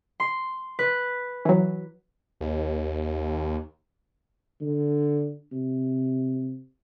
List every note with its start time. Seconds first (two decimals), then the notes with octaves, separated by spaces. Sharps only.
0.20 C6
0.79 B4
1.45 E3 F#3
2.41 D#2
4.61 D3
5.52 C3